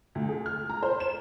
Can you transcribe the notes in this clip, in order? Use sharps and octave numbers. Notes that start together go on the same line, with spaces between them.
D2
G#4
F6
A#5
C5
E7